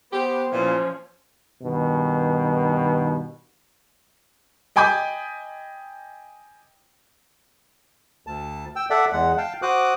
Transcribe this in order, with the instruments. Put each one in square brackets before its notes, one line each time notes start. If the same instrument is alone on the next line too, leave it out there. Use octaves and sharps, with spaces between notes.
[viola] B3 C5 [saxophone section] G4
[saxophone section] A#2 E3 [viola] F3 C#4
[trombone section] G2 B2 D#3
[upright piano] D#5 G5 G#5 B5 D6 G6
[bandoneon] D2 A5
G5 E6
A4 D5 E5 F#5
E2 G#3 F#5
F5 G5 A5
F#4 C5 D6 D#6 F#6